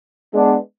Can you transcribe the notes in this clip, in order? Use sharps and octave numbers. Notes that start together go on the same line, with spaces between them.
G#3 B3 D4